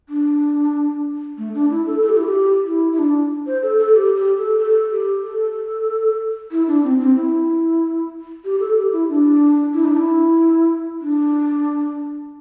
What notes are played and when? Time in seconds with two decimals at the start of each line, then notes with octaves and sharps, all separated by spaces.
0.09 D4
1.38 A3
1.54 D4
1.70 E4
1.86 A4
2.02 A4
2.09 G4
2.17 E4
2.24 G4
2.66 E4
2.93 E4
2.99 D4
3.47 C5
3.63 A4
3.79 A4
3.94 G4
4.16 G4
4.38 A4
4.59 A4
4.91 G4
5.24 A4
6.52 E4
6.68 D4
6.84 C4
7.00 C4
7.16 E4
8.45 G4
8.60 A4
8.76 G4
8.93 E4
9.09 D4
9.73 E4
9.85 D4
9.97 E4
11.01 D4